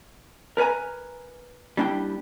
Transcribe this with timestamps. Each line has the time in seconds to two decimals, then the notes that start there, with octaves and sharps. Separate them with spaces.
0.57 A#4 B4 C#5 G#5 A#5
1.77 G3 A#3 D4 E4 G5